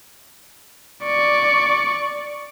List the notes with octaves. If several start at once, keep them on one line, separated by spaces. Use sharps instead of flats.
D5 C#6